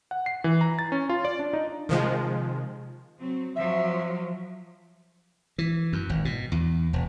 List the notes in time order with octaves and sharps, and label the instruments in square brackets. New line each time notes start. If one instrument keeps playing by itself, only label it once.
[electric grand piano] F#5
C7
E3
A#5
A6
C#4
F4
D5
D4
D#4
[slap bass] C3 [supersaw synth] D#3 F3 G#3
[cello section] F#3 C4
[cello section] F3 F#3 [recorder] E5
[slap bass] E3
F#2
G#1
B2
E2
E1